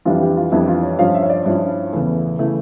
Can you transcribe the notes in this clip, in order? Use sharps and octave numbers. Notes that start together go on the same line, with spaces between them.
F2 E3 G3 D4 F4
G4
F4
F2 E3 G3 D4 E4
F4
C#5
G2 F3 C#4 F5
E5
C#5
D5
G2 F3 C#4 E4
E2 C#3 E3 A3
C#3 E3 A3 E4